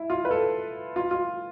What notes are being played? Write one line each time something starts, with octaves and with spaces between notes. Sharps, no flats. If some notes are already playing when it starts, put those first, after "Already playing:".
Already playing: E4
F4
B4
A4
F4
F4